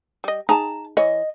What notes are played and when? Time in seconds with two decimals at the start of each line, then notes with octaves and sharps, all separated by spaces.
0.24 G3 D#5
0.49 D#4 G#4 A5 A#5
0.97 E3 C#5 D#5